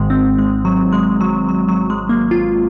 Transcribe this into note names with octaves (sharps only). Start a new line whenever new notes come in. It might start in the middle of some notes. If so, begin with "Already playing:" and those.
Already playing: G#1 G#2 D#3 G#3
C4
G#3
F#3
G#3
F#3
F#3
F#3
G#3
A#3
F4